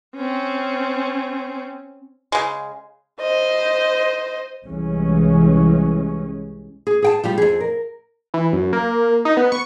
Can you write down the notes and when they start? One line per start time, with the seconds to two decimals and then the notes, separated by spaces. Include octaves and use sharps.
0.16 C4 C#4
2.32 C#3 G#3
3.21 C5 D#5
4.66 C2 E3 G#3 C#4
6.87 G#4
7.02 G#4 G5 A5
7.24 F3 G3 G4
7.38 F2 G#4
7.61 A#4
8.34 E3
8.53 F#2
8.73 A#3
9.25 D#4
9.37 B3
9.52 C#6